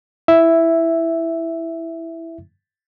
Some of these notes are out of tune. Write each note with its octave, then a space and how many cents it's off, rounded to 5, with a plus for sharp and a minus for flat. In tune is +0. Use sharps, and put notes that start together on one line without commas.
E4 +0 E5 +0